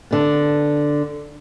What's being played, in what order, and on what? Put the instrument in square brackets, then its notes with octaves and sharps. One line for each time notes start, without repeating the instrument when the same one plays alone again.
[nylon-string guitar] D3 B3